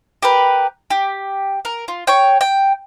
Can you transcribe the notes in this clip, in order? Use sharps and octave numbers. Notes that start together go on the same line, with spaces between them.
G4 A#4 B4
G4
A#4
F4
C#5 G5
G5